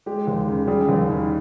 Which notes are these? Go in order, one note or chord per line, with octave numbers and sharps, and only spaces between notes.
G#3 G4
D#2
C#3
G3 G#4
D#2
D#3